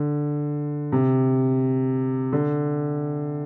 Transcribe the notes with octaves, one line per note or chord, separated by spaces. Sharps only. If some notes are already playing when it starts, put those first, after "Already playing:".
Already playing: D3
C3
D3